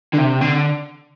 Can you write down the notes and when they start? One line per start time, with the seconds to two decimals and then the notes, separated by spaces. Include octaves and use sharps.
0.14 D3
0.19 C3
0.41 D3